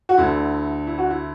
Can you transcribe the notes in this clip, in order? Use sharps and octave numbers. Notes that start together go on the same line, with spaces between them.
F#4
D2 D3 E4
E4
F#4
E4